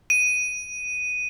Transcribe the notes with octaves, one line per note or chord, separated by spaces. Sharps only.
D#7